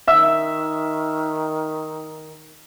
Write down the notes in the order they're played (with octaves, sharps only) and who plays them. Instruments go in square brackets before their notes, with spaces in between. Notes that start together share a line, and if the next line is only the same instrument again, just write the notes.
[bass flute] D#3 [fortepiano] E5 E6